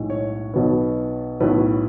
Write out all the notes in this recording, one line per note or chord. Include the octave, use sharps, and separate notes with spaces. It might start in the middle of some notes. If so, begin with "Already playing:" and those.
Already playing: B1 A2 G#3
C#5
B1 B2 F#3 B3
B1 A2 F#3 B3 B4